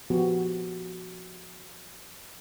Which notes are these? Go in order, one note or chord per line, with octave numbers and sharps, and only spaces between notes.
F3 B3 F#4 G4